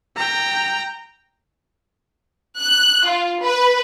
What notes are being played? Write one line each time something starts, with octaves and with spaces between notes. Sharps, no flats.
G5 A#5
F#6
F4
B4